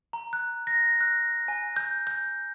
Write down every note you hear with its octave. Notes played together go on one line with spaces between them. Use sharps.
A#5
F#6
A#6
F#6
G#5
G6
G6